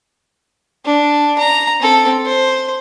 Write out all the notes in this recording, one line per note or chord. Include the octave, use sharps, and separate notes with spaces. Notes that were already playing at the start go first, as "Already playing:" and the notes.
D4
A#5
C4 A4
C5